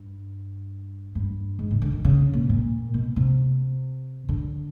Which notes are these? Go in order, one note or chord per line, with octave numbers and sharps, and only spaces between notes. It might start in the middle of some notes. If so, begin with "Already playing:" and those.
Already playing: G2
G2
G#2
C#3
D3
D#3
C#3
A#2
A#2
B2
C3
D3